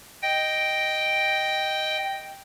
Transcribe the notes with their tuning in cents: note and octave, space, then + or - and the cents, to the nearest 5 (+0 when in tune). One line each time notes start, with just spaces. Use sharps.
D#5 +0 G5 +0